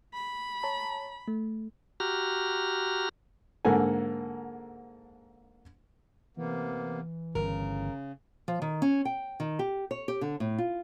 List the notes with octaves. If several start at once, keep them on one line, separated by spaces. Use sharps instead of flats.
B5
C#5 A5 A#5
A3
F#4 G4 A#5 F6
G#2 D3 A#3 A4 F#5 G#5
C3 E3 A#3 B3
G1 C#3 A#4
F3
D#3
C#4
G5
D#3
G4
C#5
G4
D3
A2
F4